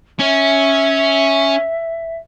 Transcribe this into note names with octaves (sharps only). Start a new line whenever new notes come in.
C#4 E5